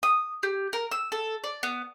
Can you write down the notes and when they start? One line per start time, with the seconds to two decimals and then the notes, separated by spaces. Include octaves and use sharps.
0.03 D#6
0.43 G4
0.73 A#4
0.91 E6
1.12 A4
1.44 D5
1.63 B3